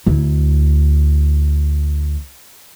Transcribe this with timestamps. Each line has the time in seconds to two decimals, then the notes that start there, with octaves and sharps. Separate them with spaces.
0.06 D2 E4